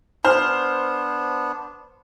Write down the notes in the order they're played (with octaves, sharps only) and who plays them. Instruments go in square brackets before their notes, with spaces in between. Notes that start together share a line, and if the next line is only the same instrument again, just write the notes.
[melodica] B3 D4 [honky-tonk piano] C5 F6